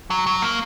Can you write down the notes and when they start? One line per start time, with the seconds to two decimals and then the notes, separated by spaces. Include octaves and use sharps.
0.10 F#3
0.27 F#3
0.42 A#3